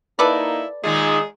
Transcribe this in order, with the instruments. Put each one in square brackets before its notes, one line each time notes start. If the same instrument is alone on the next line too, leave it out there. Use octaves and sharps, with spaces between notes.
[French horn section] A#3 D#4 [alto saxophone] E4 [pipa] A4 B4 D5
[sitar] A#2 D#3 D#4 [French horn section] G#3 [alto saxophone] G#4